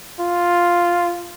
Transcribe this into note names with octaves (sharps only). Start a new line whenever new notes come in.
F4